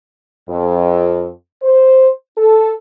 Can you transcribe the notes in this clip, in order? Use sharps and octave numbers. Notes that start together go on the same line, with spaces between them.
F2
C5
A4